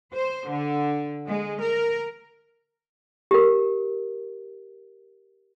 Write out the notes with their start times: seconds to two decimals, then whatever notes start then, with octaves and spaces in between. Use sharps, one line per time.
0.14 C5
0.49 D3
1.30 G#3
1.62 A#4
3.31 G4 A#4